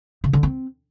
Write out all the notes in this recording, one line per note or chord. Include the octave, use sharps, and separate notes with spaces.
C#3
D3
C4